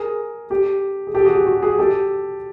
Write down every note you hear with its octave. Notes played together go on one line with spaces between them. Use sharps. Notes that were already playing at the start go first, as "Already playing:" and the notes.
Already playing: G#4 A#4
G4 A4
G#4
G4 A4
F#4 G#4
F#4
F#4
F#4 G#4
G4 A4